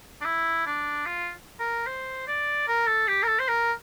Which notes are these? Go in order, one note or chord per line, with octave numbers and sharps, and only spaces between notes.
D4
E4
D4
F4
A#4
C5
D5
A#4
A4
G4
A#4
A4
C5
A#4